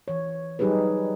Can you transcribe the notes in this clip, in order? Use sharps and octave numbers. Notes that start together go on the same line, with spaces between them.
E3 C#5
F#3 G3 D#4 G4 G#4 B4